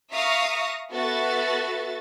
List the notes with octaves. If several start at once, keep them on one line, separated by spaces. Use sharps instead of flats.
E5 F5 A#5 C#6 D#6 A#6
B3 F#4 A4 B4 E5 A6